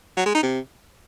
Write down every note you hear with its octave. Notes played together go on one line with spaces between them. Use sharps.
F#3
G#3
D#4
C3